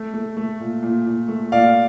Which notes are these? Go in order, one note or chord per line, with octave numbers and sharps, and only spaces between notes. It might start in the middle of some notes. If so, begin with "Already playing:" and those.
Already playing: A3
A3
A3
A#2
A#2
A#2
A3
A#2 D5 F5